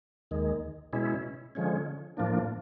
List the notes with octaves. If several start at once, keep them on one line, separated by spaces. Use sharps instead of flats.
D#2 D#3 G#3
B2 G#3 C#4 E4
D3 F3 G#3 C#4
A2 F3 A#3 D4